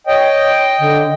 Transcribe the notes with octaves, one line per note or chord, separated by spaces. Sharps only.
C#5 D#5 G5
D3